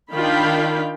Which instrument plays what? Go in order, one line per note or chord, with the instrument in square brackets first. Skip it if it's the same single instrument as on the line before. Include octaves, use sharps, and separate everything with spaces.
[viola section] D#3 D4 F4 F5 G5 B5